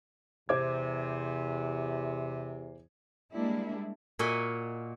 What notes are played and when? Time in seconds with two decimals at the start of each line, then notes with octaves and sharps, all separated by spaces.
0.49 E2 C3 C5 D6 G#6
3.33 G3 G#3 A#3 D4 E4
4.19 A#2 F#4 A#4 D#5 E5 G#5